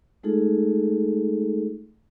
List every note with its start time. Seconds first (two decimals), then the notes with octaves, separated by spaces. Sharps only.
0.23 G#3 A3 D#4 F4 G#4 A4